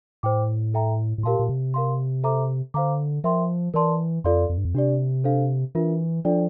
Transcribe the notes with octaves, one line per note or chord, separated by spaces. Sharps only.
A2 C5 G5 D6
A4 E5 G5 A#5
A2
A#2 G4 A#4 F5 A5 C6
A#2
C3
A#4 F5 C6
A4 C5 E5 A#5 D6
D3 C5 F5 A#5 D6
F3 A#4 E5 G5 C6
E3 A#4 D5 A5 C6
F2 F4 A4 D5 F5 C6
F2
G2
F2
C3 D4 G4 D5
D4 A4 C5 F5
E3 D4 F4 A#4 E5
F3 D4 F4 A4 D5 G5